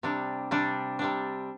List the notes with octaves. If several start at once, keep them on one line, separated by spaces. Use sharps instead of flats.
C3 G3 D4
C3 G3 D4
C3 G3 D4